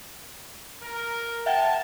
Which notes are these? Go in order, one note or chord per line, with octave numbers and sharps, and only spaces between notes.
A#4
E5 F#5 G5 A5